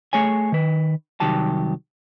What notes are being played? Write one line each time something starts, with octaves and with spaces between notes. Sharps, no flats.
A3 G#4 C#5 G#5
D#3 B4
C2 D#3 F#3 G4 A5